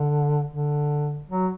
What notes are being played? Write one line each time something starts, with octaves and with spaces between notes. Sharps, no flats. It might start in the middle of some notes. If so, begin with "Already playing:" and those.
Already playing: D3
D3
F#3